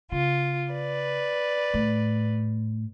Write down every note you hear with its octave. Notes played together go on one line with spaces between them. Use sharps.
C#3 F4
B4 D5
A2